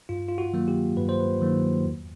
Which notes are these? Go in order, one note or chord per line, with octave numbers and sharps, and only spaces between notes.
G2 F4
F4
F#4
D#3 F#3 A#3
G4
G2 B4
C5
B4
D#3 F#3 A#3
E2